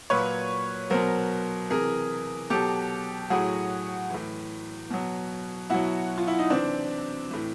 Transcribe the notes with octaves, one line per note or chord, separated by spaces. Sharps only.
A#2 F#3 B4 C#5
B2 F#3 A#4 C5
C3 E3 G#4 A#4
B2 F#3 G4 A4
A2 F#3 F#4 G#4
A2 E3
B2 F#3
B2 F#3 E4 F#4
F4
E4
D#4
C3 E3 C4 D4
A2 E3